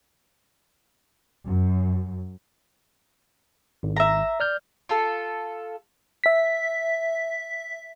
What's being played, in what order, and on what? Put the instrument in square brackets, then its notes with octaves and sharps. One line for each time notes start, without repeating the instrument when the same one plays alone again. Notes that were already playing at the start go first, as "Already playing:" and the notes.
[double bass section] F#2
[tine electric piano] G#1
[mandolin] E5 A#5
[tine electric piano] D5 F6 G6
[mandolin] F4 A4
[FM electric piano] E5 B6